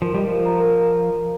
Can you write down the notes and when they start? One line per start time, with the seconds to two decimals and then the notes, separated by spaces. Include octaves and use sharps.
0.02 F3 A#4
0.14 G3 D#5
0.27 F3 A#4
0.46 A#5
0.60 A#4